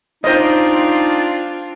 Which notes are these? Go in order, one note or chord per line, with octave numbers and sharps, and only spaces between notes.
C4 D4 D#4 F4 C5 D#5